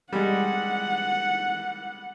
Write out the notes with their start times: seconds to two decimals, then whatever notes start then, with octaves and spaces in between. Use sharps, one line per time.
0.13 G3 G#3 F#5